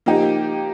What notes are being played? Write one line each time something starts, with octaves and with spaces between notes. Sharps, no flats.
F3 A#3 D#4 G4